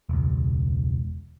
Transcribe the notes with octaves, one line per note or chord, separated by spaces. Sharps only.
E1 C#2